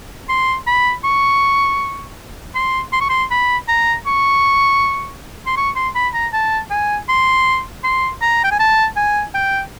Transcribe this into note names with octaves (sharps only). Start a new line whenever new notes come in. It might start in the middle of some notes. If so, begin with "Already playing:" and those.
C6
B5
C#6
C6
C6
C#6
C6
B5
A#5
C#6
C6
C#6
C6
B5
A#5
A5
G#5
C6
C6
A#5
G5
G#5
A5
G#5
G5